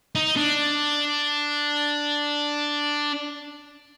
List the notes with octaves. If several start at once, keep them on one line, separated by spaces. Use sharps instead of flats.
D#4
D4